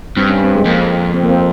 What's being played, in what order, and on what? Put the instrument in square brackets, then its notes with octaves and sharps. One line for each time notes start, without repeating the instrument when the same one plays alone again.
[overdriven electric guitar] G2 [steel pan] C4
[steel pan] C#4
C4
G#3
[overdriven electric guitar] F2 [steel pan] A#3
[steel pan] C4
A#3
C4